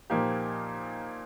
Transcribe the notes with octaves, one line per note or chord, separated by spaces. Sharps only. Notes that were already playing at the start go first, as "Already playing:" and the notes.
A#2 F3 A#3 D#4 G4